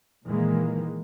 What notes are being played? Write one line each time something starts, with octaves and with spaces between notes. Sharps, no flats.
A#2 D#3 E3 G#3 A#3